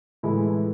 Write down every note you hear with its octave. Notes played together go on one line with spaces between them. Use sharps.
A2 E3 G#3 E4